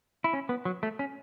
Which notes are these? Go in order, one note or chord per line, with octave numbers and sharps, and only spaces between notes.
E4
C#4
B3
F#3
A3
C#4